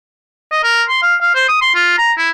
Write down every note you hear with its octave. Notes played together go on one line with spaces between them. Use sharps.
D#5
A#4
C6
F5
F5
C5
D#6
C6
F4
A#5
E4